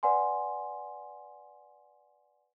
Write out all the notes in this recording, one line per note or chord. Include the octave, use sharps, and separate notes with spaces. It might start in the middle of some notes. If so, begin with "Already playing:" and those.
B4 D5 F#5 G#5 C6